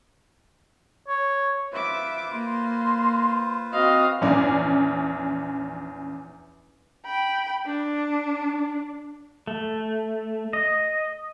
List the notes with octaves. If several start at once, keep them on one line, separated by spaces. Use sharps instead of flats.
C#5
F4 B4 C5 E5 D6
A#3 C6
C4 F#4 D#5 F5
A#1 E2 C#4 D4
G5 B5
D4
A3
D#5